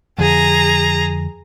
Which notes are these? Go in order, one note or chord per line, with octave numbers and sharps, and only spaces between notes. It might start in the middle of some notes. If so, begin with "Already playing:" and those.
F2 D3 F3 G#4 A#5